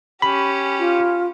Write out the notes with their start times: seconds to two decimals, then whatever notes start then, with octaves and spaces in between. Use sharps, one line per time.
0.22 C#4 G4 B5
0.79 F4